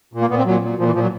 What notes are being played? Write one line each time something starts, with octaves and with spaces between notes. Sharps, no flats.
A#2
A#3
A#2 B3
C4
A#2 F#3
A#2
A#2 F3
E3
A#2 F3
F#3